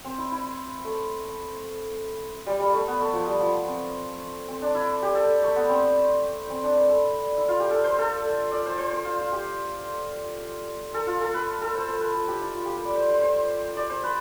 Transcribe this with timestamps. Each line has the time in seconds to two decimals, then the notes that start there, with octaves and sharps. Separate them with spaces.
0.05 C4
0.18 E4
0.32 E4
0.85 A3
2.47 G3
2.59 G3
2.73 A3
2.87 B3
3.00 A3
3.13 F3
3.27 G3
3.40 F3
3.67 C4
4.48 C4
4.62 D4
4.75 E4
5.02 G4
5.15 A4
5.43 A3
5.55 B3
5.69 C4
6.50 C4
6.63 D4
6.77 B4
6.90 A4
7.37 E4
7.48 F4
7.60 G4
7.71 A4
7.84 C5
7.98 A4
8.51 D5
8.66 C5
8.78 C5
8.92 C5
9.05 F4
9.19 F4
9.32 G4
10.94 A4
11.07 F4
11.20 A4
11.34 B4
11.61 A4
11.75 C5
11.88 C5
12.01 B4
12.14 A4
12.28 G4
12.41 E4
12.55 F4
12.66 G4
12.75 B4
12.85 D5
12.95 C5
13.09 C5
13.22 C5
13.76 D5
13.90 C5
14.03 B4